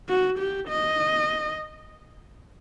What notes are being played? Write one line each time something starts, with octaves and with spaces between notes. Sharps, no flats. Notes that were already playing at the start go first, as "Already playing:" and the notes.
F#4
G4
D#5